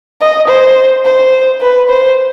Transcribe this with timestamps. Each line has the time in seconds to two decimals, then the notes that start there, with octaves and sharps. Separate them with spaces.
0.21 D#5
0.48 C5
1.05 C5
1.62 B4
1.90 C5